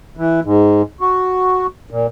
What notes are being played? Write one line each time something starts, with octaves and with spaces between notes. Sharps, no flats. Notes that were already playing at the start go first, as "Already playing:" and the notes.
E3
G#2
F#4
A#2